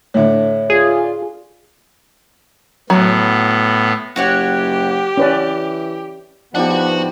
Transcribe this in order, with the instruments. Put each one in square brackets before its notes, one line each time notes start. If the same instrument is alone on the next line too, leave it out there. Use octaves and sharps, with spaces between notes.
[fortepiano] A2 D3 [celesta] C#5 E5
[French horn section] F4 D5 [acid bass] G#4
[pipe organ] A2 B3 [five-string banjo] F#3
[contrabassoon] F#1 [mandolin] F#4 C#5 F#5 [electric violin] G4
[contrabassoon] E3 [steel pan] C#4 B4 D5
[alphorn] F3 [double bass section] B3 [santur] D4 D#4 G4 [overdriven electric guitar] F#4 F#5